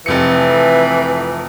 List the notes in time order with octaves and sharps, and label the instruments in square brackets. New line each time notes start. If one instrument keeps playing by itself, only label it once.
[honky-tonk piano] F1 F2 C#7 [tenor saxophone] E3